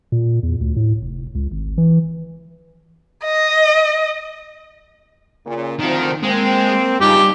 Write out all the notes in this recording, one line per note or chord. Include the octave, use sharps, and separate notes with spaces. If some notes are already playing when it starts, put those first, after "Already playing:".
A#2
E2
D2
A2
F1
C#2
G#1
E3
D#5
A#2 C#3
D2 D#3 F3 C4
G#3 A#3 C4
G2 C#3 F3 D#4 G4